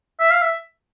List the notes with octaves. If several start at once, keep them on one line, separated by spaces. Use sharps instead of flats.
E5
F5
E5